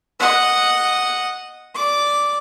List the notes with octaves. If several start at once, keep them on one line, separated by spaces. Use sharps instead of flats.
D#5 F#5
D5 D6